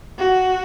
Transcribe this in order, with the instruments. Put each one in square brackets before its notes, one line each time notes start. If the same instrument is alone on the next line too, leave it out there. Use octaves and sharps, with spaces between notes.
[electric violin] F#4